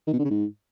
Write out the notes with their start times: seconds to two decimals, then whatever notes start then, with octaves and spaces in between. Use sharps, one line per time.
0.07 D#3
0.13 B2
0.19 D3
0.24 C#3
0.30 G#2